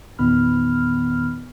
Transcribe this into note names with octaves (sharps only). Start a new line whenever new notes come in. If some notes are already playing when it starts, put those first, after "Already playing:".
E2 A#2 D#3 B3 B5 F6